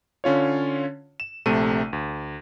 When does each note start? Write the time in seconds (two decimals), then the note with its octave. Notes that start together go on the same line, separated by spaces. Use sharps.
0.24 D3 C#4 F4 C#5
1.20 E7
1.46 A#1 C3 A3 D#7
1.93 D2